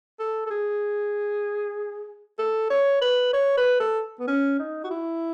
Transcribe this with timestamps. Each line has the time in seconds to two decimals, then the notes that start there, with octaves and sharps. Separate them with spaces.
0.19 A4
0.47 A4
0.50 G#4
2.39 A4
2.70 C#5
3.02 B4
3.33 C#5
3.57 B4
3.80 A4
4.20 B3
4.28 C#4
4.59 D#4
4.84 F#4
4.91 E4